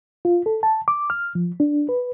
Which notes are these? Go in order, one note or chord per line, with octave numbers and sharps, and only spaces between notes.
F4
A4
A5
D6
F6
F3
D4
B4